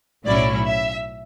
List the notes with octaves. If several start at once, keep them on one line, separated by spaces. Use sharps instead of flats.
B1 A2 F#3 C#4 E4 D5
E5